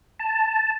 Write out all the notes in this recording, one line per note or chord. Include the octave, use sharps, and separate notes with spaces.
A5